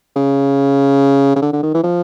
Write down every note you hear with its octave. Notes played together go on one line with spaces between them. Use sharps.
C#3
C#3
D3
D3
D#3
E3
F3